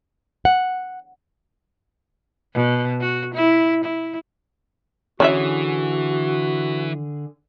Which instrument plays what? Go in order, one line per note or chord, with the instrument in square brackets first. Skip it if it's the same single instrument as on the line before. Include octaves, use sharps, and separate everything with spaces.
[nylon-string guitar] F#5
[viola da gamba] B2
F#4
E4
E4
[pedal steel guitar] D3 G#4 [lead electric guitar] E3 [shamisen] C#4 E4 E5 [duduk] F#4